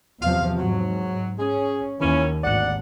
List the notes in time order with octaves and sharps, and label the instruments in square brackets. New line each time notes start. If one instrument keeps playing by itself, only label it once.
[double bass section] E2 C3 F3 [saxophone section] F5
[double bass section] G#2 [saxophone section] F#3
[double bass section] C#4 [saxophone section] G#4
[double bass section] D#2 [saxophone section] E3 C#4
[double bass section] G#1 [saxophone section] D2 D5 F#5